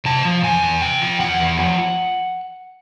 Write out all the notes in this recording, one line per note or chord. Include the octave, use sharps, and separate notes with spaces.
C3 A5
F3
E2 G#5
E2
C3 G5
F3
E2 F#5
E2
F3